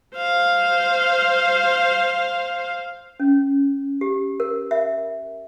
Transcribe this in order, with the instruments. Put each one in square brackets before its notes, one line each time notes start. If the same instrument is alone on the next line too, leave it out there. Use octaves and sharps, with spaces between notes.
[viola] C5 F5
[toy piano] C#4
G4
A#4
E5